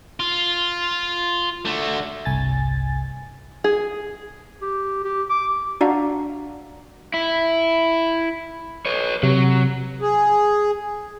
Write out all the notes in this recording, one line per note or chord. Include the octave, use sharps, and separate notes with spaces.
F4
D3 A3
G1 C2 G#5 A6
G#4
G4
G4
D6
D4 F#4 D5 F5 F#5 A#5
E4
B4 C#5
C3 F#3
G#4